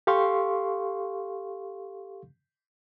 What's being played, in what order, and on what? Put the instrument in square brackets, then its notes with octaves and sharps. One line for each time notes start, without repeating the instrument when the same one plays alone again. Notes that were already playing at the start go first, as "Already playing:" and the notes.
[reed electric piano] G4 A4 F5 C6 C#6